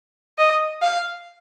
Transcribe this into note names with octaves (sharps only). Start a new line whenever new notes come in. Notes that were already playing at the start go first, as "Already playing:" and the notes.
D#5
F5